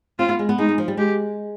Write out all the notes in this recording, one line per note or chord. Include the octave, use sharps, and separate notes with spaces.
C4 F4
B3
G#3
B3
G#3 D#4
G#3
F3
G3
G#3 G4